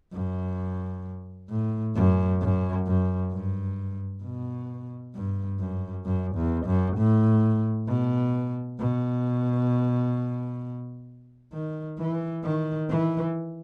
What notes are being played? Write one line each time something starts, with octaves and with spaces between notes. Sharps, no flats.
F#2
A2
F#2
F#2
F#2
G2
B2
G2
F#2
F#2
E2
F#2
A2
B2
B2
D#3
E3
D#3
E3